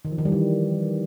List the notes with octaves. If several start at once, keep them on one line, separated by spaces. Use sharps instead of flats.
D#3
F3
D#3
G3
E3